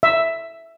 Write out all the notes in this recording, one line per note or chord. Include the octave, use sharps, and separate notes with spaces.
E5